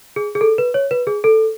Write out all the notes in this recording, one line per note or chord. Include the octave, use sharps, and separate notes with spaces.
G#4
G#4
A4
B4
C#5
B4
G#4
A4